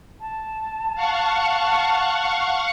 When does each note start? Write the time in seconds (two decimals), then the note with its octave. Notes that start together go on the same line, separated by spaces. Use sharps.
0.21 A5
0.95 F5 F#5 C#6